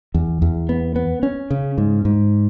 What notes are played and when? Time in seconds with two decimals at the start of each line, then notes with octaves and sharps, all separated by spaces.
0.14 E2
0.42 E2
0.69 B3
0.96 B3
1.23 C#4
1.51 C#3
1.78 G#2
2.05 G#2